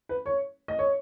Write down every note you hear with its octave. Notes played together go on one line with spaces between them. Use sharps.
B4
C#5
D#5
C#5